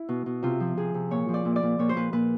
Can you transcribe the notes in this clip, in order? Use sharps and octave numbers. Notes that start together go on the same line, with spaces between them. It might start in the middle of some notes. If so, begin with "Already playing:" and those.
Already playing: E4
B2
B2
C3 F4
F3
C3 G#4
C3
A#2 C#5
F3
D5
A#2
D5
A#2
A#2 C#5
C5
A#2 B4
A#2 B4